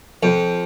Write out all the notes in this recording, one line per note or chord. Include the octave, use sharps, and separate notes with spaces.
F2